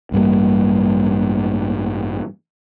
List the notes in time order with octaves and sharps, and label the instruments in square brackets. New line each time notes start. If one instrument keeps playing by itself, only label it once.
[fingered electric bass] A1 G2 G3 A#3